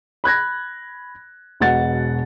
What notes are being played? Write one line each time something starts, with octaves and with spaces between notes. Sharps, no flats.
B5 F#6 G#6 A#6
E1 B2 F#5 A6